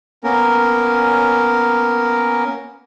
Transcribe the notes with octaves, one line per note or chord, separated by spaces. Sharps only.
A#3 B3 C#4 A#4